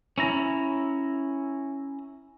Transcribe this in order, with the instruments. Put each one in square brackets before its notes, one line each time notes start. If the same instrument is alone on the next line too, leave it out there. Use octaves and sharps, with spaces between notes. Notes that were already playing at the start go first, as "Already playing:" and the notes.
[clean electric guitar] C#4 E4 A#5